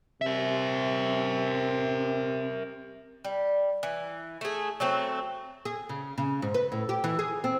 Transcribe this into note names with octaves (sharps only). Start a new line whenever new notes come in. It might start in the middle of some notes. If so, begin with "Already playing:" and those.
C3 A#4 E5
G3
E3
A3 G#4
F#3 A3 C4
G#4
C#3
C#3
G#2
B4
A2
G4
E3
G#4
C4